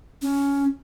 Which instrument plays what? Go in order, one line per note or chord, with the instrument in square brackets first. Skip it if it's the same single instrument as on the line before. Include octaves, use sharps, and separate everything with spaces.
[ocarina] C#4